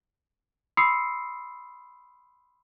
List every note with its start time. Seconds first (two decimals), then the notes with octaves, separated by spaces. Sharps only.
0.77 B5 C6 D#6 E6 C7 C#7